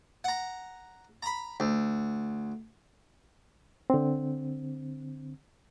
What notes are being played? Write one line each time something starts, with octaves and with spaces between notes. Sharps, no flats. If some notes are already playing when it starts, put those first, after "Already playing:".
F#5 A#5
A#5 B5
D2
D3 C4